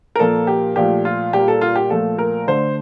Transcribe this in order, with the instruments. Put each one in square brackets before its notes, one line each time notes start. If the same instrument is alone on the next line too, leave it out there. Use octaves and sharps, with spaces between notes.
[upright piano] A#4
A#2 F3 A#3 A4
G4
A#2 F3 A3 G4
F4
A#2 G3 A#3 G4
A4
F4
G4
A#2 F3 A3 A4
A#4
D3 A3 C5